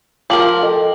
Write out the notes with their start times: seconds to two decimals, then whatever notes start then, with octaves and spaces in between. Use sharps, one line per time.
0.30 F3 A#4 G5 D6 F#7
0.63 A4 D#5 G5